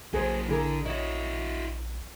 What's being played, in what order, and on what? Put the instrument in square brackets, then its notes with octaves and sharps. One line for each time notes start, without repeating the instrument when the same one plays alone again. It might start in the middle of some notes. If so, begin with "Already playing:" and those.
[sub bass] A#1 [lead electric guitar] F#3 A#3 [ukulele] G#4 B4 C5
[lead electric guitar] D3 [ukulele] E4 G#4 A#4
[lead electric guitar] E4 F#4 [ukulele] C#5 D#5